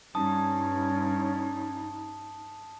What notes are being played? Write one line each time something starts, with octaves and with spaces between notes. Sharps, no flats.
G2 C#4 D#4 A5 D#6